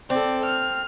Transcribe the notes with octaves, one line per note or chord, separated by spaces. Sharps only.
C4 A4 D5
F6